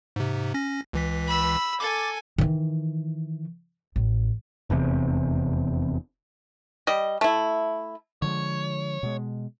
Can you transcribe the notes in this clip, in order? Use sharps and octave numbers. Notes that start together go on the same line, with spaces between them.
G#2 C3
C#4 A#6
C#2 E3 B6
B5 E6
A4 G#5 D6 A6
D#3 E3
A1
F1 E2 G2 C3
G3 D#5
A3 E4
D3 F3 G#3 C#5
B2 G#3